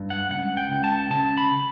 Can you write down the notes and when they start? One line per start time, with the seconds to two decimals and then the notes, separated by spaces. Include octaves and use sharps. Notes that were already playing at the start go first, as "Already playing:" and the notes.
Already playing: G2
0.10 F#5
0.31 C#2 F#5
0.57 G5
0.70 C#2
0.84 A5
1.10 C#3 A5
1.37 B5